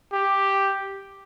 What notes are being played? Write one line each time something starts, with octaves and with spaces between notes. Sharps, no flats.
G4